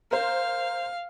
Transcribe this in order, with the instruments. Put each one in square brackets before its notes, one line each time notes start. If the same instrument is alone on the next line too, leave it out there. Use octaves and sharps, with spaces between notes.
[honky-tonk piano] A#4 C5 [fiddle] F5